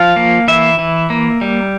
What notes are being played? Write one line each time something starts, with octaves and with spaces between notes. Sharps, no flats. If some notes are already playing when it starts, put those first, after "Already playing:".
Already playing: F3 F5
A#3
E3 E5
E3
A#3
G3